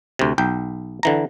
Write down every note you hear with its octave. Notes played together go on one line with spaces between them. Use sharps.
D2 C3
B1 G5
D3 E3 A#5